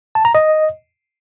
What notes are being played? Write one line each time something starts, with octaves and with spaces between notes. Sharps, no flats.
A5
A#5
D#5